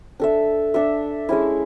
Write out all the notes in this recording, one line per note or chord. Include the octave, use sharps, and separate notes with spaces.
D4 A4 E5
D4 A4 E5
G#3 C#4 E4